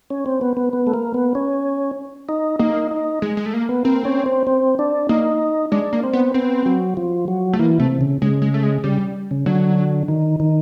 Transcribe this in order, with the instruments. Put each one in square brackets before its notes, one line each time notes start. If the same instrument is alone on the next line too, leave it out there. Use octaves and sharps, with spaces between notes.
[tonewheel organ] C#4
C4
B3
B3
B3
A3
A#3
B3
C#4
D#4
[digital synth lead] A#3 [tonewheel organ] D#4
[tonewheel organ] D#4
[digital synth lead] G#3
G#3
A3
A#3
[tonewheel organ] B3
[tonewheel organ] A#3 [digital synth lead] C4
[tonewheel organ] C#4
C4
C4
D4
[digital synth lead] A#3 [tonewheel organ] D#4
[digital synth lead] G#3 [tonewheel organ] D4
[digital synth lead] A#3
[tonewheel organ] C4
[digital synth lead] B3
[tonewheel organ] B3 [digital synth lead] C4
[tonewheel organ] F#3
F3
F#3
[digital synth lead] A3
[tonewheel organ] E3 [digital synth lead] A#3
[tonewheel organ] C3 [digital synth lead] A3
[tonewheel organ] C#3
[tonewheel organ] C#3 [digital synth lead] G#3
[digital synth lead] G#3
A3
G#3
[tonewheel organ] C#3 [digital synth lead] G3
[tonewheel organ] C#3
[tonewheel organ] D3 [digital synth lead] F#3
[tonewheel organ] D#3
D#3